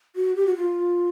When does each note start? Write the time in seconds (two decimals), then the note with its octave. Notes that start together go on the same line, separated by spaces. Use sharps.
0.16 F#4
0.36 G4
0.46 F#4
0.56 F4